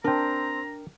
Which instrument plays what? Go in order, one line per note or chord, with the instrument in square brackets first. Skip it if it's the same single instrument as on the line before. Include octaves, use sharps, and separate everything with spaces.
[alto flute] C4 [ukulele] D4 [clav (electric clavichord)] A#4 G5 [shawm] A#5